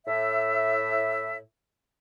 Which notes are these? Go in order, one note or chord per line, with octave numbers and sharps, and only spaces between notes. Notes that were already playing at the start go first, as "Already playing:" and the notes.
A2 E5